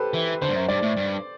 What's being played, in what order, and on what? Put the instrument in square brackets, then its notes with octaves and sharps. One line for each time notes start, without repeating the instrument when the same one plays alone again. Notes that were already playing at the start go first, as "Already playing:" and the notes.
Already playing: [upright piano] G4 A4 B4 C5
[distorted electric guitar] E3
[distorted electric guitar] D3 [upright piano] C5
[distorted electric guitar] G2
F#2
[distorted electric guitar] G2 [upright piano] D5
[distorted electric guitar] A2
G2